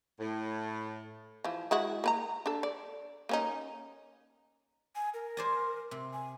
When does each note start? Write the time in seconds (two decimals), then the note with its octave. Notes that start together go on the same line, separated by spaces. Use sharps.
0.20 A2
1.44 E3 F3
1.71 G#3 E4 F#4
2.04 A#3 B4 A#5
2.46 D4 A4
2.63 D5
3.29 A#3 C#4 D#4
4.95 G#5
5.14 A#4
5.37 C5 D5 G#5
5.91 C3
6.13 G#5